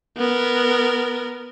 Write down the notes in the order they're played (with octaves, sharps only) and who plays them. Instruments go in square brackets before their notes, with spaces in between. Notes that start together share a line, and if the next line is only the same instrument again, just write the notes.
[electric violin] B3 A#4